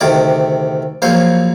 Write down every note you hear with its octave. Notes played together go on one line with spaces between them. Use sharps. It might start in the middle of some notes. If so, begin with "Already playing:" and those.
D2 C3 D#3 D5
A#1 A#2 F#3 C5